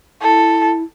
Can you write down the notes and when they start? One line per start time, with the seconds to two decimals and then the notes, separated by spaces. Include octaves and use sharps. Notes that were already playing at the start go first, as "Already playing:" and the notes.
0.22 E4 A4